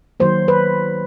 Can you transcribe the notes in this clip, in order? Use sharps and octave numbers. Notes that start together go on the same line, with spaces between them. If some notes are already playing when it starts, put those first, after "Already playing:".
D#3 F#3 A#3 C5
B4